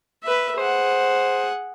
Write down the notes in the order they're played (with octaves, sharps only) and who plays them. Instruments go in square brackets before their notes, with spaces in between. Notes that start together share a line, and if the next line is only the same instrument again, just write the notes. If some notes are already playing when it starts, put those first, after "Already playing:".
[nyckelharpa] B4 E5
[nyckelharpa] G#4 F#5 [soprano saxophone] C5